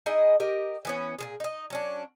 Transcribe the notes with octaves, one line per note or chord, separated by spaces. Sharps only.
D#4 E4 G#4 D#5
G4 A#4 D#5
E3 B3 C#4
A#2 D#3 G#4
D#4 D#5
F#3 C#4 D4